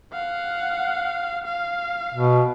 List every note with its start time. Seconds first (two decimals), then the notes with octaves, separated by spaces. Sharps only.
0.12 F5 F#5
1.45 F5
2.14 B2